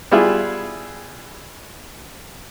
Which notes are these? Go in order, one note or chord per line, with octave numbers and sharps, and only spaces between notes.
G3 B3 E4 F4 G#4